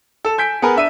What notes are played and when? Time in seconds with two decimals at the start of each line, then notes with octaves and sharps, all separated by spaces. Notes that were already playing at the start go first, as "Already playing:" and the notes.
0.25 A4 E7
0.38 G#5 G6 B6 D7
0.62 B3 G#4 A#4 B4
0.76 D4 E5 D#7